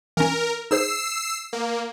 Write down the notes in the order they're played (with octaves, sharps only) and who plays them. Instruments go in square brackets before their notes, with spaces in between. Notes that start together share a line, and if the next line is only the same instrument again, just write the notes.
[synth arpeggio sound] E3 C#4 [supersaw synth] A#4
[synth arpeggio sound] D#4 G#4 C5 [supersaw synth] E6 C7
[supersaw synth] A#3